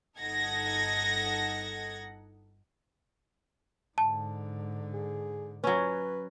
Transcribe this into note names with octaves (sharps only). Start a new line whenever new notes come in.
G1 D#4 A4 F#5 G#6 A#6
G#2 D3 A5
G#4
F#3 C#4 B4